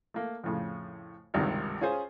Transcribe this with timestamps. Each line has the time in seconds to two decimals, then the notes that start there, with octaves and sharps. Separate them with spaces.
0.14 A3 A#3
0.44 F2 A2 C#3
1.34 G#1 C#2 G2 C3 D#3 A#4
1.81 C#4 F4 G#4 C5